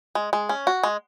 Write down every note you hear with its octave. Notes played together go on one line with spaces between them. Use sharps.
G#3
G#3
C#4
F#4
G#3